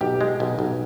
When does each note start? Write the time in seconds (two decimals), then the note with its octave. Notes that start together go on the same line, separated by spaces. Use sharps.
0.01 B1 G4
0.21 G#3
0.40 B1
0.59 B1